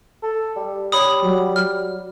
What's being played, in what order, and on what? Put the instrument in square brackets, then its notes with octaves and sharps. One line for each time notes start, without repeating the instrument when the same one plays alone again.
[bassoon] A4
G3
[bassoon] G3 [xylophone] C#5 B5 D#6
[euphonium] F#3
[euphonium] F#3 [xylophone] F6